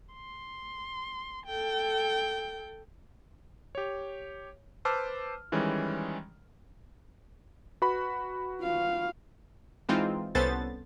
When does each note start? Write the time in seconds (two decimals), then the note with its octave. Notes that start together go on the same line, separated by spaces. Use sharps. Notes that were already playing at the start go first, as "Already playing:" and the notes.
0.14 C6
1.46 A4 G5
3.75 G4 C#5
4.85 B4 C5 A5 D6 E6 F6
5.52 D#3 E3 G3 G#3 C#4
7.82 F#4 B4 B5
8.61 F4 F5
9.89 E3 G#3 C4 D#4 F4
10.35 C2 B3 C#4 A4 C5 A6